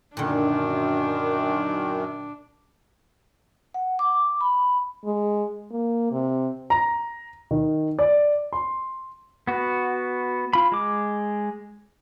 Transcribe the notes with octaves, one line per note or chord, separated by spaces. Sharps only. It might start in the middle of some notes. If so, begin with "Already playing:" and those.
F#2 A#2 D3 D#3 D4
F#5
D6
B5
G#3
A#3
C3
A#5
D#3
D5
C6
B3 F#4
F4 B5
G#3 D6